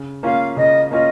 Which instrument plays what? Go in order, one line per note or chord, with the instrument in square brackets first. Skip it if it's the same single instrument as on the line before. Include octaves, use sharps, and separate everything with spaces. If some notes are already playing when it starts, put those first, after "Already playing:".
Already playing: [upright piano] C#3
[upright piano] A#3 C#4 F4 [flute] F5
[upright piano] C#3 [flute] D#5
[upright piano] A#3 C#4 F4 [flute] D#5